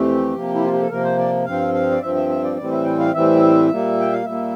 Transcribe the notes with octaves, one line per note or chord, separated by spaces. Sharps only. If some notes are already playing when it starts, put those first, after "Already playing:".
Already playing: F2 E3 A3 C4 G4
C3 F3 A#3
E4
F4
G4
A4
C3 F3 A#3 A#4
C5
D5
G2 F3 C4 F5
F5
D5
G2 F3 C4 E5
E5
E5
D5
A2 E3 G3 C4 D5
E5
G5
F5
A2 E3 G3 C4 E5
A#2 G3 A#3
G5
F5
A#2 G3 A#3 E5